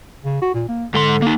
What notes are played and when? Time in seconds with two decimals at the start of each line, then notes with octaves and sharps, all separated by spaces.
0.25 C#3
0.42 F#4
0.54 A#2
0.68 A#3
0.94 G#2 D3 C6
1.22 A#3 D#4